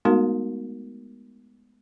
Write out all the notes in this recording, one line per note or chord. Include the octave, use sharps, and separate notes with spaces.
G#3 A3 B3 D#4 F#4 A#4